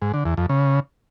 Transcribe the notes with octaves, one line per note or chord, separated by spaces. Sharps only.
G#2
D3
E2
F2
C#3